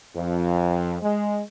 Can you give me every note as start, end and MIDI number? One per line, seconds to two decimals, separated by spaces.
0.16 0.97 41
1.03 1.41 56